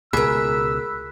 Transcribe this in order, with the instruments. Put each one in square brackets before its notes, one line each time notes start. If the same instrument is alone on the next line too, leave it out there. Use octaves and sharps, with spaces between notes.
[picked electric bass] C#2 B2 [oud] G#4 A#4 [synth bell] B5 F#6 B6 [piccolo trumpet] E6